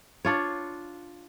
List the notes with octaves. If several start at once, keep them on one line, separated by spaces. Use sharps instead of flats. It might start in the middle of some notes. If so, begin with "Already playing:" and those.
D4 F4 C#5